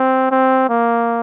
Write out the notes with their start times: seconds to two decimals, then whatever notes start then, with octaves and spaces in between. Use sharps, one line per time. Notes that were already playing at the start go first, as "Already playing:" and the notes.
Already playing: C4
0.31 C4
0.69 A#3